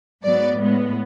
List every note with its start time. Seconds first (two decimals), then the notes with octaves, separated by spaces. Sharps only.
0.23 G#2 F#3 B3 D5
0.58 A2 G#3 B3